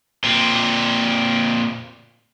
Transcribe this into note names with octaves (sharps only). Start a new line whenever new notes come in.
A#2 C4